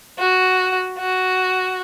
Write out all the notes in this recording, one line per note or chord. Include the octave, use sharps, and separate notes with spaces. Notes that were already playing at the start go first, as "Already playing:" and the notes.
F#4
F#4